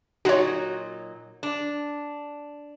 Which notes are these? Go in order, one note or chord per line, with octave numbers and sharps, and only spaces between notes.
A#2 F#3 D#4 F#4 C#5
D4